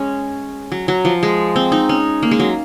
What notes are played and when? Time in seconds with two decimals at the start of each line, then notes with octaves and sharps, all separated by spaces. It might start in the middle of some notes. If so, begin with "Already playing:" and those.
Already playing: G#3 C#4
0.72 F#3
0.88 F#3
1.05 F3
1.23 G#3
1.56 C4
1.72 D#4
1.89 C#4
2.23 A#3
2.31 G#3
2.40 F#3